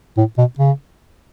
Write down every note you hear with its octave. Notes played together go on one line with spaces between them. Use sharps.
A2
B2
C#3